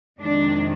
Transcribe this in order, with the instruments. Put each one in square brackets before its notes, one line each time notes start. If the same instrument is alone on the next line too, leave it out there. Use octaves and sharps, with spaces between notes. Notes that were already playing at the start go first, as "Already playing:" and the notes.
[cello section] F2 C3 D#3 G#3 D4